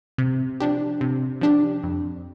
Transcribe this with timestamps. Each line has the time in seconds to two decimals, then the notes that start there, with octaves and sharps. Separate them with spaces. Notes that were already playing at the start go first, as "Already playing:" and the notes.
0.18 C3
0.60 F3 D4 G4
1.01 C3
1.41 F3 D4 G4
1.83 F2